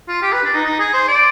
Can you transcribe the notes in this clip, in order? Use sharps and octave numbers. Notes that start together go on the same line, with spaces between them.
F4
G4
B4
D4
D#4
D#4
G#4
C5
D5